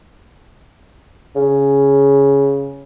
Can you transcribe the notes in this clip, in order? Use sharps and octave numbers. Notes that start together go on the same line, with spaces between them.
C#3